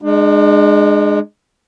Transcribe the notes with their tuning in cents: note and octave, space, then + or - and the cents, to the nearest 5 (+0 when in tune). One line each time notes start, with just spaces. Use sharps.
G#3 +0 D4 +45